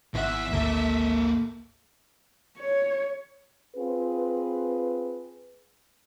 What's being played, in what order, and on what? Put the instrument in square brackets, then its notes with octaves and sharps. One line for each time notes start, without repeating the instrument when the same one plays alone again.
[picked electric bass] G#1 [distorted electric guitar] E2 F#5 [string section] E5
[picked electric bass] G#1 D2 [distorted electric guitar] A#3 A4
[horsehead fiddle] C#5
[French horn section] C4 F4 G#4 B4